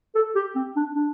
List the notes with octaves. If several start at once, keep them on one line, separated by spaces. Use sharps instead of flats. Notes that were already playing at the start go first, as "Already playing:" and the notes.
A4
G4
C4
D4
D4